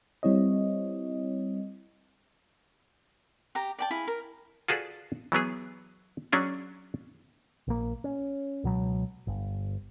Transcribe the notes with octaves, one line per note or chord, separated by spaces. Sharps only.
G3 C4 E4 C#5 D#5
G4 A#5
D5 G5 A5
E4 G#4 F5
A#4
F4 F#4 G#4 A4 B4 D5
E3 F#3 B3 G#4
F#3 C#4 D4 G#4
A#1 A#3
C#4
C#2 B2 F#3
G1